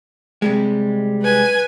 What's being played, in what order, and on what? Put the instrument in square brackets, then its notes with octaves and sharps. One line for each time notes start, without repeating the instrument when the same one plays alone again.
[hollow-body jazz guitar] C3 G3 G#3
[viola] B4 G#5